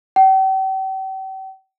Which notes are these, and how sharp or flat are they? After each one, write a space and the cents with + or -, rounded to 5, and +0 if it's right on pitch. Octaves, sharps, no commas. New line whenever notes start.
G5 -40